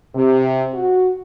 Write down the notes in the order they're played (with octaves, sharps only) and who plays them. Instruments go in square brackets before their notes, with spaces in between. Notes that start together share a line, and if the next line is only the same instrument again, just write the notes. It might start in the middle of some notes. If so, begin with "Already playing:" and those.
[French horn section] C3
F#4